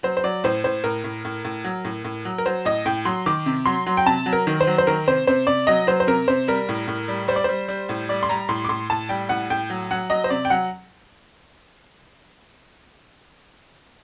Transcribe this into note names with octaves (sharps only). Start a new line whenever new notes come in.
F#3 C5
C5
F#3 D5
A2 C5
A2 C5
A2 A#4
A2
A2
A2
F#3
A2
A2
F#3
A#4
F#3 C5
A2 D#5
A2 G5
F#3 C6
D#3 D6
C3
F#3 C6
F#3
G5
C3 A5
F#3
A#4
D#3
C5
F#3
C5
D#3 A#4
C3 C5
C3 C5
C3 D5
F#3 D#5
F#3 C5
C5
C3 A#4
C3 C5
G3 A#4
A2
A2
G3
G3 C5
D5
G3 C5
G3
A2
G3 D5
C6
G3 A#5
A2 C6
D6
A2 C6
A2 A5
G3 G5
A2 F#5
A2 G5
F#3
F#3 F#5
F#3 D#5
C5
C3 D5
G5
F#3 F#5